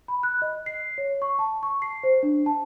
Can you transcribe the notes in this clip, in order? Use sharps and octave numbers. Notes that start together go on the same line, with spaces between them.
B5
F#6
D#5
C7
C#5
C#6
A5
C#6
C7
C5
D4
A5